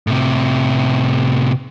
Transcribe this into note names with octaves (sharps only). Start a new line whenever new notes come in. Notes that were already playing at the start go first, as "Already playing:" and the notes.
A2 C3